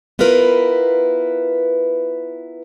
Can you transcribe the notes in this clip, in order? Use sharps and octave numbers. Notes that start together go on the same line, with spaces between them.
B3 E4 F4 A#4 B4